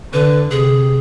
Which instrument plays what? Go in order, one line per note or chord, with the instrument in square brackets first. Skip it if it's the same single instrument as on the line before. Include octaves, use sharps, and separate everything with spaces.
[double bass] D3 [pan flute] B4
[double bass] C3 [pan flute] G#4